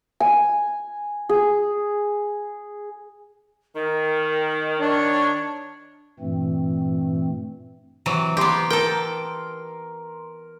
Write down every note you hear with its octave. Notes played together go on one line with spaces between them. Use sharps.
G#5
G#4
D#3 A#4
D4 C#5
G2 A#2 E3 A3 C4
C3 E3 F#3
B3 G4 A#5 C6
A4 A#4 G5